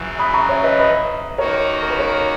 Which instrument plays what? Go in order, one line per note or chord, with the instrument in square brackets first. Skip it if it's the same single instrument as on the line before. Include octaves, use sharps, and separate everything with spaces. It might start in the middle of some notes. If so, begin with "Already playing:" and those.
Already playing: [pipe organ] F#2 C#3 E3
[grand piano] B5 D#6
A#5 C#6
C#5 E5
B4 D#5
B4 D#5
[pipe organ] D#2 D#3 A#3 D#4 F#4 [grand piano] A#4 C#5
[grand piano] A#4
B4
A#4 C#5